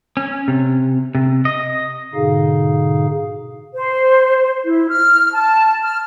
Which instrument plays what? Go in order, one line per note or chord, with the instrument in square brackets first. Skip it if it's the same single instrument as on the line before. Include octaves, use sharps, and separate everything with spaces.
[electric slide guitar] C#4
C3
C3
D#5
[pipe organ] G#2 B2 D3 D#4 G#4 F5
[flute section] C5
E4
F6
A5
F6